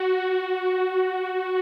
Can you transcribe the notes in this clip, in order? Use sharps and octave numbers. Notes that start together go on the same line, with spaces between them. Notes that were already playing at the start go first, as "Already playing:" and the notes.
Already playing: F#4